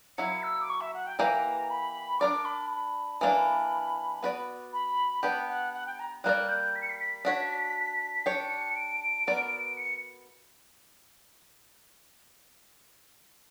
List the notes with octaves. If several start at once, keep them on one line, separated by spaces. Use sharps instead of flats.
F#3 A#3 E4 C#7
E6
D6
C#6
E5
F#5
G5
E3 A#3 E4 G4 B4 A#5
B5
D4 A#4 D5 D6
B5
B5
E3 A#3 D4 B5
B3 F#4 B4 D5
B5
B3 D4 G4 B4 F#5
F#5
F#5
G5
A#5
G3 A#3 D4 A#4 D5 F#6
G6
B6
C#7
B6
B6
D4 F#4 C#5
D4 G4 C#5 C#7
D7
B3 F#4 A#4 D5
C#7